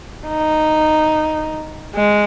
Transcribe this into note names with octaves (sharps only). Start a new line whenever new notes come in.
D#4
G#3